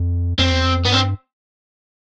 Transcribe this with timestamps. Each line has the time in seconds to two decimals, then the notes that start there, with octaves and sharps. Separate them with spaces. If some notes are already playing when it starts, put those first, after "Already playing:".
Already playing: F2
0.39 F2 C4
0.51 E2
0.65 F2
0.86 G2 B3
0.93 C4